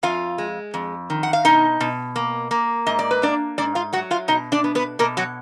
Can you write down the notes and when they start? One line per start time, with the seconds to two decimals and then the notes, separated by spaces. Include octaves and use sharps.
0.03 F2 F4 F5
0.38 G#3
0.74 F2
1.10 D#3
1.23 F#5
1.33 F5
1.45 B2 D#4 D#5
1.80 B2
2.16 A#3
2.51 A#3
2.87 G#2 D#5
2.99 D5
3.11 B4
3.22 A#3 D4 D5
3.58 G#2 D4 D5
3.75 F4 F5
3.93 F#3 F#4 F#5
4.11 F4 F5
4.28 B2 D#4 D#5
4.52 D4 D5
4.64 B3
4.75 B3 B4
4.99 B2 A#3 A#4
5.17 F#3 F#4